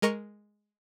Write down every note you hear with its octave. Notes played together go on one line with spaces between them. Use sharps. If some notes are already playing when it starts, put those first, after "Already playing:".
G#3 A#4 D#5 A#5 C#6 C#7